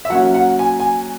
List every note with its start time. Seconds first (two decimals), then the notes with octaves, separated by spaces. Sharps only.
0.05 E5
0.10 F#3 A#3 C#4 F#5
0.34 F#5
0.59 G#5
0.80 G#5